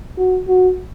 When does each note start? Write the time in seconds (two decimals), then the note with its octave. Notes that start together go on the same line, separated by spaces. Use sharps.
0.17 F#4
0.48 F#4